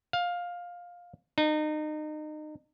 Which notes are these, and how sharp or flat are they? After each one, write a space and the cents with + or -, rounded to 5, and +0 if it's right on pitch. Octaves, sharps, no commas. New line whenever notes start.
F5 +15
D#4 -30